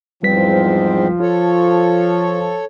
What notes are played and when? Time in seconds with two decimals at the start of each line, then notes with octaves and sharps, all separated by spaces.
0.23 E2 G#2 F3 G3 C4 B4 B6
1.20 F4 A4 C#5